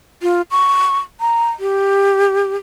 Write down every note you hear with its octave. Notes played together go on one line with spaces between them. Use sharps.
F4
C#6
A#5
G4